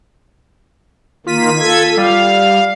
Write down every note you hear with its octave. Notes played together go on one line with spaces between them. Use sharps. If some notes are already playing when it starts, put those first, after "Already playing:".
D#3 A#3 F4 B6 D#7
A4 G#6
G3 F5